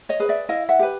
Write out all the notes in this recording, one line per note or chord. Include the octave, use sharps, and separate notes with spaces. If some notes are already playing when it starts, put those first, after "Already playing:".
C#5 D#5
G#4 B4
D5 E5
E4 D#5 F5
E5 F#5
G4 B4